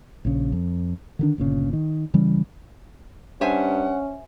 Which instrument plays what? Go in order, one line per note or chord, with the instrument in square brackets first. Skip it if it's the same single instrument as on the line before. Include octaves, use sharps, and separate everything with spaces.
[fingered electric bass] A#1 C#3
F2
D3 D#3 D4
G1 A#2 C#3
D#3
C#3 E3 G3 C#4
[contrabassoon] G2 [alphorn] C#4 [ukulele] C5 E5 G#5 [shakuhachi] F#5